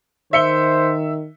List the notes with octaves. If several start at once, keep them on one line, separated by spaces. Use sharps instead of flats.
D#3 C5 E5 C#7 G7